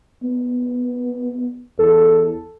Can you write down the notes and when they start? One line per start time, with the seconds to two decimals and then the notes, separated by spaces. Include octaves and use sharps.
0.24 B3
1.79 E2 A4